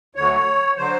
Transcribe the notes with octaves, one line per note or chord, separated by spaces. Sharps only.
D2 D3 F#3 C#5
D3 F#3 C5